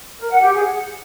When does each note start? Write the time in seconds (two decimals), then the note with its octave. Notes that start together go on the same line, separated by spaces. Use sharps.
0.20 A#4
0.31 F#5
0.41 G4
0.52 G#4
0.63 F#5